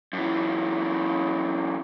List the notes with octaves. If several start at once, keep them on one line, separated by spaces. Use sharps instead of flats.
F#2 E3